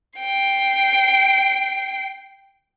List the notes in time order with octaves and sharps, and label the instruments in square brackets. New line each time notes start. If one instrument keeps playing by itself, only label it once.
[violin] G5 C7